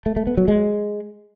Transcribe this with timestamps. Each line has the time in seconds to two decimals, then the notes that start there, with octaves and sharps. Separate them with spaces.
0.06 A3
0.16 A3
0.27 B3
0.37 F#3
0.48 G#3